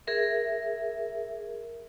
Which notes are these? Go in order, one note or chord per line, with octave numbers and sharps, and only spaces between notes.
G#4 A#4 E5